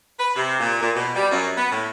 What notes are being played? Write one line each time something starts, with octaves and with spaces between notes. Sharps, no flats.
B4
C3
A#2
A#2
B2
G3
F#2
B3
A2